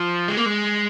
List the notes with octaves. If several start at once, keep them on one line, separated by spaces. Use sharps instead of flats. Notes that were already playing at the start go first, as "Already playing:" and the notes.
Already playing: F3
G#3
A#3
G#3